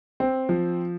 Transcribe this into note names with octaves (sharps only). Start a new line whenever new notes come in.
C4
F3